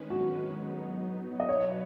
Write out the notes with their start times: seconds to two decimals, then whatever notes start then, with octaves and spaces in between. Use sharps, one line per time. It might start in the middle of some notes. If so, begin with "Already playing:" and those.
Already playing: D#3 G#3 C#4 D#4 B4
0.10 F#4
0.56 F#3 B3 D#4
1.40 D#5
1.48 B2 F#3 B3 F#4 B4 C#5